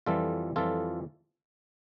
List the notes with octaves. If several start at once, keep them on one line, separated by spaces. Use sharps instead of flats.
F2 E3 G3 F4 A4
F2 E3 G3 F4 A4